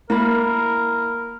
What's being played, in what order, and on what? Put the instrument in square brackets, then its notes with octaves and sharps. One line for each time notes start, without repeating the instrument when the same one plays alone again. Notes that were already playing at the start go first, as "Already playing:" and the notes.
[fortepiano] A#3 [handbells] E4 B5 [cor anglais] A#4